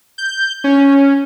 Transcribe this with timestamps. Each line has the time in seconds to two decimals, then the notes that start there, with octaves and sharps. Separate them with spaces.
0.18 G6
0.64 C#4